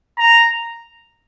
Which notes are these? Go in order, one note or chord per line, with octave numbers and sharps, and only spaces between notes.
A#5